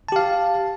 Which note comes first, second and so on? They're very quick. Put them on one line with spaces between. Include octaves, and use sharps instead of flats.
A5 G4 F5